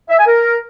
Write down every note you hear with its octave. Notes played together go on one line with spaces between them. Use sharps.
E5
G#5
A#4